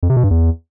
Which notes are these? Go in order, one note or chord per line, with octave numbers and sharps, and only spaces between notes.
F2
C3
B2
G2
E2